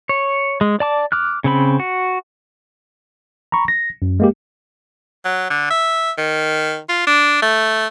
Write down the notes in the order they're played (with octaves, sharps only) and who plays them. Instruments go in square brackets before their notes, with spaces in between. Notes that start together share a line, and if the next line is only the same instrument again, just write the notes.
[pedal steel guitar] C#5
G#3
D5 A5 D6
D6 F6 F#6
C#3 C4 B5
F#4
[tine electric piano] A#5 B5 C#6
A#6
F#2
G#3 A#3 G4
[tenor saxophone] F#3
D3
E5
D#3
F4
D4
A3